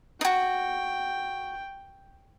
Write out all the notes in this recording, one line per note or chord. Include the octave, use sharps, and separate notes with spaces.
D#4 F#4 G5